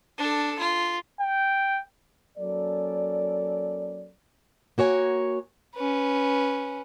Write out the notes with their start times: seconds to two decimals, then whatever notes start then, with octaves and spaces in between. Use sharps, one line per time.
0.18 D4 A4
0.59 F4
1.20 G5
2.38 F#3 A#3 C#4 A4 D5
4.78 A#3 F#4 C#5 G#5
5.76 C#4 B4